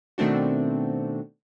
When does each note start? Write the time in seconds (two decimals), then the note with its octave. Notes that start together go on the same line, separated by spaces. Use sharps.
0.18 B2 D#3 A3 C4 D4 F#4